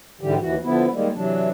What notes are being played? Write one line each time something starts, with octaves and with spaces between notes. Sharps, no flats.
G#2 D3 E3 G3 G4
D#2 E3 F#4
D3 F3 B3 E4
D#3 G3 G#3 A#3
C3 E3 F#3 D4